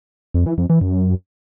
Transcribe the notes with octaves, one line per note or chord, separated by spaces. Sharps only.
F2
E3
F2
E3
F#2